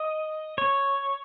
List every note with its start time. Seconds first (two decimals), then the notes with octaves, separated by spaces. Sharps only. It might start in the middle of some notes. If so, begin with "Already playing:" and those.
Already playing: D#5
0.58 C#5